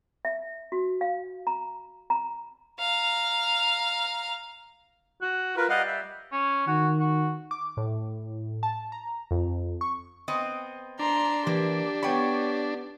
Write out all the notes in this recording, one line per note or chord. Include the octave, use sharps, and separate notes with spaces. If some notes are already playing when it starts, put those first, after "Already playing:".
E5
F#4
F5
A#5
A#5
F5 A#5
F#4
F4 A#4 B4
G3 D#5 F5 F#5
E5
C#4
D#3 F#4
F#4
D6
A2
A5
A#5
F2
C#6
B3 C4 D#5
D4 A#5 C6
E3 A#3 G4
B3 C#5 D5 G5 B5